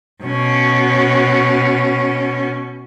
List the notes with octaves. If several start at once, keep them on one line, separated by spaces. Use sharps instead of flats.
B2 C#4